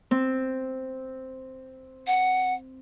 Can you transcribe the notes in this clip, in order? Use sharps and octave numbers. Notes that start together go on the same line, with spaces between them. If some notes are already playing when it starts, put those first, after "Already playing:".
C4
F#5